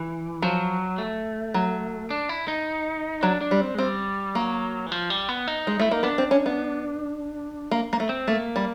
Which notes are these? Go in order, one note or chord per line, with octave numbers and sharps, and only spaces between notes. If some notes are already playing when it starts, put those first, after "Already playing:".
Already playing: E3
F3 F#3
A3
F#3
D4
E4
D#4
F#3 D4
D4
G3
C4
G#3
G3 C4
F#3 A#3
E3
F3
G3
B3
D#4
G#3
A3 E4
A#3 D#4
B3 D4
C4
C#4
B3
A#3
A#3
A3
C4
A3 A#3
G3